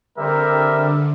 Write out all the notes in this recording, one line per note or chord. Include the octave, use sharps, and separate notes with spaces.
D3 G3 C4 G4 A#4 E5